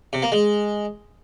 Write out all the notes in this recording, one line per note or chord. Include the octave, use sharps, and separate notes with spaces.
C3
A#3
G#3